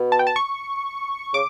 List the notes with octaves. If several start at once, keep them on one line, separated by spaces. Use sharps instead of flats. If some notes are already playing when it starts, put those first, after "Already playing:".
Already playing: B2
A5
G5
A5
C#6
C#3 D6